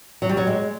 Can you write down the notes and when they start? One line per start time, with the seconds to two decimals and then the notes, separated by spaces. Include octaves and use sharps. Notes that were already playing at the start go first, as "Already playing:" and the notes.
0.22 F#3
0.29 G3
0.37 F#3
0.47 G#3